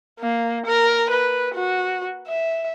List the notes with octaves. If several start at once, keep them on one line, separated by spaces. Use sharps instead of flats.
A#3
A#4
B4
F#4
E5